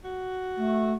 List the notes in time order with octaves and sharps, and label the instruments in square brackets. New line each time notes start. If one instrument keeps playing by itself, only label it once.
[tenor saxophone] F#4
[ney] A3